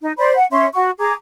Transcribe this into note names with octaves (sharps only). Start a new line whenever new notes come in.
D#4
C5 D5 B5
F#5
C#4 E5 C6
F#4 C#6
G#4 A#5 D6